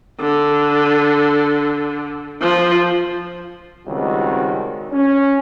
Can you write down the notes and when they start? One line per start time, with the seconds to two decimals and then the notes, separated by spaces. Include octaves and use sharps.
0.20 D3
2.41 F3
3.87 G#1 C#2 D#3 G3 C4 F#4
4.92 C#4